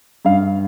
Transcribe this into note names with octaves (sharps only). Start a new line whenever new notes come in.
G2 F5